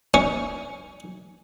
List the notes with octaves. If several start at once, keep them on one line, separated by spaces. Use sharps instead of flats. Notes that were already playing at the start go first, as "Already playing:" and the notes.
C#4